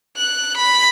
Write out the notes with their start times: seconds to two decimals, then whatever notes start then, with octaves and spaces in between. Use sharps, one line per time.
0.17 F#6
0.58 B5